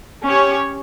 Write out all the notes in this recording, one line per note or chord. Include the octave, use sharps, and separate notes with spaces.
C#4 G4 C#5